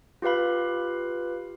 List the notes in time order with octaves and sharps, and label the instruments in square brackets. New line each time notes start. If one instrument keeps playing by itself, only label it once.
[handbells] F4 G4 B4 F5 B5